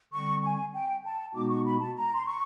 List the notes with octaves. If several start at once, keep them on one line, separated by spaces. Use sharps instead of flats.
D3 G3 C4 C#6
G#5
G5
A5
B2 G#3 B3 D#4 F#4 D6
C#6
B5
A5
A#5
C6
C#6